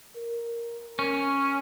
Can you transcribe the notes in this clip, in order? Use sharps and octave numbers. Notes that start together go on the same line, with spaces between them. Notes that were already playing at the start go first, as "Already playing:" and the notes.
A#4
C#4